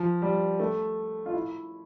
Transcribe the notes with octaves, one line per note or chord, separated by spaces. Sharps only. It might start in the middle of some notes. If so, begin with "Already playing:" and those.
Already playing: F3
G3
A3
F4
E4